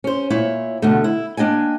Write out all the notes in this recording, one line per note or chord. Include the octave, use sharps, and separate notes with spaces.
C#4 C5
A#2 E4 C#5
B2 D3 A3
E4
A#3 D4 D#5 G5 G#5